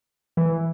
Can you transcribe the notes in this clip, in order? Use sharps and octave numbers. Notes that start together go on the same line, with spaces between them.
E3